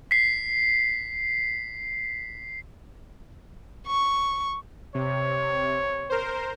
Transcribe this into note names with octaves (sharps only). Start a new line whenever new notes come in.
B6 C7
C#6
C3 C#5
A#4 C5